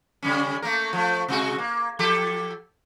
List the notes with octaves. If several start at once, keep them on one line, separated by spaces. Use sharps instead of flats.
C#3 G3 C#4
A3 A#3 A#4
F3 A3
C3 G#3 F#4
A#3
F3 G4 A4